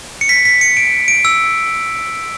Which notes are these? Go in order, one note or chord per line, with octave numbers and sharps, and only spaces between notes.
C#7
B6
B6
C#7
D7
D7
E6